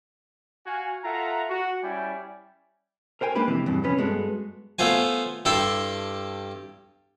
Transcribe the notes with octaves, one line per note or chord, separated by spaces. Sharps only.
F#4 F5 G#5
F4 A4 E5 F#5 A#5
F#4
G3 C#4 E4 D5 G5 G#5
A#4 C5 G5 G#5
G#3 A#3 D4 G4 B4
F2 C3 E3
E2 G2 B2
F2 C3 B3 C#4 B4
G2 G#3 B3 D#4 F#4 A4
A3 B3 F4 C5 G#5
G2 E4 G4 A4 A5 C6